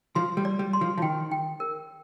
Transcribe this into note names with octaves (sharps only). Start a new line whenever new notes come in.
F3 C6
G3
D5
G3
C6
F3
F3
D#3 G5
G5
A#4